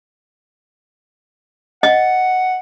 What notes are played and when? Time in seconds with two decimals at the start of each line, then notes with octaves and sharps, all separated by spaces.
1.83 D#5 F#5